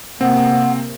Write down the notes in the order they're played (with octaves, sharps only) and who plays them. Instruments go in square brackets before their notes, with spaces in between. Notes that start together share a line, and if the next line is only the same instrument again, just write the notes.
[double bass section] C3 A#3 [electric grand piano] C4 [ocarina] F#5